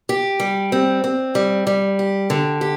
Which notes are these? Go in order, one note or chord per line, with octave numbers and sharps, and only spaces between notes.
G4
G3
C4
C4
G3
G3
G4
D3
G4